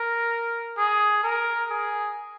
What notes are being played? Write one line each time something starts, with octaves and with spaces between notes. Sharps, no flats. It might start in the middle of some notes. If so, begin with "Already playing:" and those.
Already playing: A#4
G#4
A#4
G#4